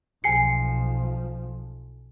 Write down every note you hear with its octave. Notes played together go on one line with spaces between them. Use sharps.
B1 F3 G#5 C7 C#7